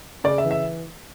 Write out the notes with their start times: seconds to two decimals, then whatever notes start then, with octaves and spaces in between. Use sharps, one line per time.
0.24 C#3 D5
0.38 E5
0.45 E3
0.51 E5